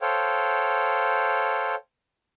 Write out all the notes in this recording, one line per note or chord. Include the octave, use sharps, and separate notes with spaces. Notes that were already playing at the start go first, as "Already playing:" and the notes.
A4 C5 C#5 F5 G5